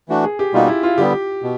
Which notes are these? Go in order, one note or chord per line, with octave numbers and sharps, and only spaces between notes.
E3 A3 D4 F#4
G#4
G4
B2 G3 A#3 D#4 F4 F#4
E4
F4
D3 G3 B3 G4
B2